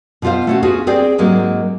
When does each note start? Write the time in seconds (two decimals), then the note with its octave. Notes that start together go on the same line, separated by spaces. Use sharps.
0.22 B2 B3 F4 C5 F5
0.47 A3 C#4 F#4
0.63 B3 C#4 F4 F#4 G#4
0.87 C4 G#4 C5 D5 G5
1.18 G#2 F#3 G#3 A#3 C4